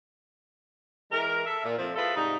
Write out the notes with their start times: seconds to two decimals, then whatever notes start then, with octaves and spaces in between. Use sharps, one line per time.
1.11 E3 G#3 A#4
1.45 A4 E5
1.63 A#2
1.77 F2 F3 A3 C4 C5
1.96 E4 F4 G#4 A4 B4
2.15 G#2 C3 G3 D#4